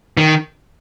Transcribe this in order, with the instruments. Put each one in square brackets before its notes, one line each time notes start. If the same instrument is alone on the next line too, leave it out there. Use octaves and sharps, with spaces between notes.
[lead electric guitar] D#3